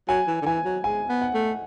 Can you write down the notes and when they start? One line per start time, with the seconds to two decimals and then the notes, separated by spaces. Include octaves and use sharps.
0.08 F#3 G#5
0.28 E3
0.42 D3
0.46 E3 G#5
0.65 F#3
0.84 G#3 G#5
1.09 B3
1.22 F#5
1.34 A3